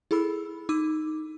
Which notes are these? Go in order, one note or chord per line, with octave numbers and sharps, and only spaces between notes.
E4 G#4 A4 B5 E6
D#4 D6 E6 D#7